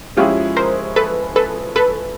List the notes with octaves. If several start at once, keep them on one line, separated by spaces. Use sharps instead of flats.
F3 G#3 C#4 E4 F4 G4 G#4
A#4 C5
A4 B4
A4 B4
A4 B4